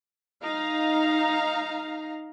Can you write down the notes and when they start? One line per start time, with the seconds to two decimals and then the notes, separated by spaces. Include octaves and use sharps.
0.42 D#4 F5 A#5